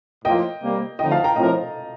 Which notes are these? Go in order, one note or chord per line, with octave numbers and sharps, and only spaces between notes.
A2 F3 A#3 F4 D#5 G5
C3 G3 A#3
D2 D3 F3 C4 D#4 D#5 G5
F5 A5
G5 A#5
A2 F3 C4 F4 A#4 D#5 G5